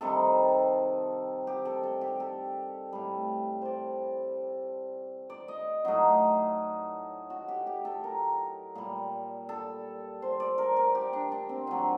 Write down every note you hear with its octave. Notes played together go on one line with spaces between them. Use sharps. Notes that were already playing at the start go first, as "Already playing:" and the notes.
C3 D#3 G3 A4
G4
A4
A4
G4
A4
A2 G3
C5 D5
D5
D#5
A2 F#3 D#4
F#4
G4
G4
A4
A#4
A#2 G3
A4
C5
D5
A#4
A#4
G4
D4
D4
C4
A#2 F#3 D4